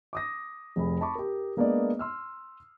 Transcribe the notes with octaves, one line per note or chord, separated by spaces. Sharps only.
D6 D#6 A#6
F1 G#4 B5
A5 B5 C#6 D6
G4 A#4
G#3 A#3 B3 D4 D5 D#5
C6 E6 F6